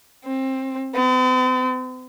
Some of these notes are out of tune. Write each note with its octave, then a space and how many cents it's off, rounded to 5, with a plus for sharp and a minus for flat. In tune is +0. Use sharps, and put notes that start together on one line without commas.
C4 +25
C4 -45